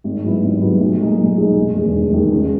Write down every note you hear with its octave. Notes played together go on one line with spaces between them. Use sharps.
G#1
G#2 F#3 B3 E4
G#1
G#2 F#3 B3 E4
B1
A#2 G#3 D#4 G#4
B1
A#2 G#3 D#4 G#4
E1
E2 D#3 G#3
E1
E2 D#3 G#3
C#2